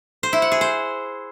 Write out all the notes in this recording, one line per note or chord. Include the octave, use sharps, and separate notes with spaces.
C5
E4
F#5
G#4
C5